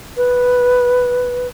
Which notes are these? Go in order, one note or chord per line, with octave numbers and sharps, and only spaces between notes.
B4